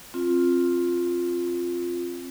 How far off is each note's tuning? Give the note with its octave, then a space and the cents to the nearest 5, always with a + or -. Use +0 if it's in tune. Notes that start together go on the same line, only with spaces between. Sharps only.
C4 +20 F4 +0